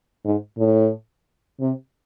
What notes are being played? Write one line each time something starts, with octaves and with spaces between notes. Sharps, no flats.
G#2
A2
C3